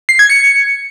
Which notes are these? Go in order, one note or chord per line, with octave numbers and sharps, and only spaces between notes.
C7
G#6
C#7